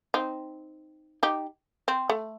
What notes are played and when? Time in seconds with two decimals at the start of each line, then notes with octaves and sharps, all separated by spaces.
0.14 C4 D#4
1.23 D#4 G4
1.88 C4
2.10 A3